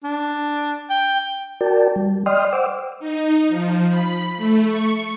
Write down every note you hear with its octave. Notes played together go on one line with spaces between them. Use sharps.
D4
G5
F#4 A#4 D5 G5 A5
G3
D5 D#5 G5 C6 D#6 F6
C5 F#5 G5 D6 E6
D#4
F3
B5
A3
C#6